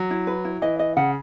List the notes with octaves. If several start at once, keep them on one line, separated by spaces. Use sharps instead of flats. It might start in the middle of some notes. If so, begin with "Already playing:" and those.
Already playing: F#3
E4
B4
E4
E3 D#5
D#5
C#3 F#5